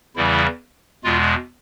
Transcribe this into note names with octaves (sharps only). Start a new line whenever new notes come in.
E2 C#3 E3 G3 E4
E2 B2 G#3 F4